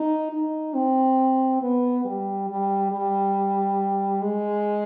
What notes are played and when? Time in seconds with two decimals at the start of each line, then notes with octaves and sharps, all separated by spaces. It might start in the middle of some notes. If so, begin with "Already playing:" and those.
Already playing: D#4
0.31 D#4
0.74 C4
1.61 B3
2.04 G3
2.49 G3
2.92 G3
4.22 G#3